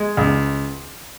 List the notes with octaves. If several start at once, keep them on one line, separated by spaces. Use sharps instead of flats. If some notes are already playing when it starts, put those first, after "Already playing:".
Already playing: G#3
C#2